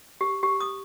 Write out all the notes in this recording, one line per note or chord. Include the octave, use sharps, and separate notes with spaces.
G4
G4
D#6